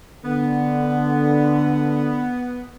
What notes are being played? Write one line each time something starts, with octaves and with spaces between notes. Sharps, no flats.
D3 B3